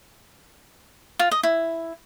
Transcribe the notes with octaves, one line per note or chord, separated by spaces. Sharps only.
F4
D#5
E4